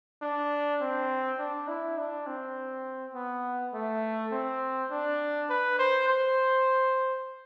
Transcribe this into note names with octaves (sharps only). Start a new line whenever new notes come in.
D4
C4
D4
E4
D4
C4
B3
A3
C4
D4
B4
C5
C5